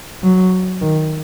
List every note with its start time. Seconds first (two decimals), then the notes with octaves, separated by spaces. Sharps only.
0.23 F#3
0.81 D#3